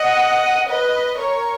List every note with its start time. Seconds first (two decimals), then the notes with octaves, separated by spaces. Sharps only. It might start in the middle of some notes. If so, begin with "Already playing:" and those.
Already playing: D#5 F#5
0.69 B4 D#5
1.18 A#4 C#5